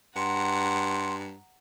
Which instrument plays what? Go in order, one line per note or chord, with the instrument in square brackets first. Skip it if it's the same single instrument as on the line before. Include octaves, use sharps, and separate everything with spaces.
[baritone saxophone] G2 [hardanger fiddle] F#5 A#5 [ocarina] C6